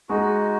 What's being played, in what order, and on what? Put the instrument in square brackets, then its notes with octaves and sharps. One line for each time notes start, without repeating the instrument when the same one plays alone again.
[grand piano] G#3 [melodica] D#4 F#4